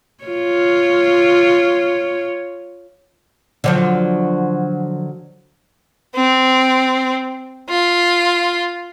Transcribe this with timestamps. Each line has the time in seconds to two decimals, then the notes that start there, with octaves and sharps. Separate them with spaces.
0.25 F4 C#5
3.64 D3 F3 F#3
6.15 C4
7.69 F4